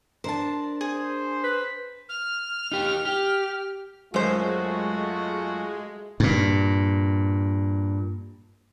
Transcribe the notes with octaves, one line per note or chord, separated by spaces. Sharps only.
D4 A#4 C5 A5
G#4 C5
B4
F6
D#4 G4
G4
F#2 G#3 A3 F4 F#4 C5
G2 A#2